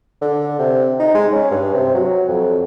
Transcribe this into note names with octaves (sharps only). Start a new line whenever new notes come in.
D3
C3
D#4
G#3
C#4
G2
C3
F#3
F2